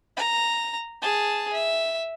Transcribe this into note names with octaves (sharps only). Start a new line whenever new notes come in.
A#5
G#4 A5
E5